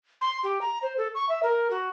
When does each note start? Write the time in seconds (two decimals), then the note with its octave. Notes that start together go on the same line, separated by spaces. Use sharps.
0.21 C6
0.43 G4
0.61 A#5
0.83 C5
0.97 A4
1.15 C#6
1.29 E5
1.43 A#4
1.70 F#4